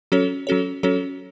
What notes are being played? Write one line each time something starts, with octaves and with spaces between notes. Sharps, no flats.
F#3 C#4 F#4 A4 C#5
F#3 C#4 F#4 A4 C#5
F#3 C#4 F#4 A4 C#5